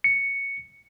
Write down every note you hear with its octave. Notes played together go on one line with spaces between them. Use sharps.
C#7